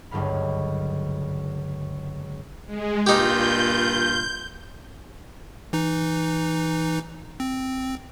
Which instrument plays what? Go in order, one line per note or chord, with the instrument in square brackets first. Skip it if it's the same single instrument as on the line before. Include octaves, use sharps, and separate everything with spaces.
[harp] F#1 C#2 G2 D3 F5 B5
[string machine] G#3
[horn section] G2 A#2 F4 [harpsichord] D#4 G4 [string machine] G6
[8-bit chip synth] E3 D#4
C4